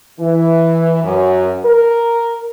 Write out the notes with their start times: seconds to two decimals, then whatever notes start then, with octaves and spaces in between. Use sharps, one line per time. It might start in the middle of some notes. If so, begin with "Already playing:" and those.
0.20 E3
1.04 F#2
1.65 A#4